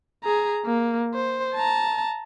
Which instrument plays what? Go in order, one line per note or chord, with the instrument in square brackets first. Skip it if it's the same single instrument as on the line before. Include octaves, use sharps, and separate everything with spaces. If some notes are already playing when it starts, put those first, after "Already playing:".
[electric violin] G#4 A#5
A#3
C5
A5 A#5